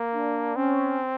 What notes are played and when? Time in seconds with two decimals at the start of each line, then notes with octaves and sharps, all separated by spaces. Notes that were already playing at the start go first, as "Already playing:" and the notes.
Already playing: A#3
0.15 D4
0.56 C4 C#4